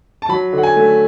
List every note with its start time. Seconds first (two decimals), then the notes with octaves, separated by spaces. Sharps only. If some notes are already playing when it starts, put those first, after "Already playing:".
0.22 A5
0.29 F#3 B5
0.53 D3
0.58 F#5
0.63 G#5
0.76 A3